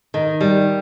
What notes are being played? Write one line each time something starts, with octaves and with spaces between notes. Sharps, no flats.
D#3
G3